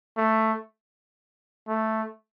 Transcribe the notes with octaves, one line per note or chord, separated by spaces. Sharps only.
A3
A3